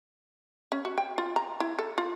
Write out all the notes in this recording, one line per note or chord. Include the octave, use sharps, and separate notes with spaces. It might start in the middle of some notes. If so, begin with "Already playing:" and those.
C#4
F#4
G5
F4
A#5
E4
A4
F4